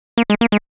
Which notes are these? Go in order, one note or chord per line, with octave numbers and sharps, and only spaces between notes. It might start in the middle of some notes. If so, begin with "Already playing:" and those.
A#3
G#3
A#3
G#3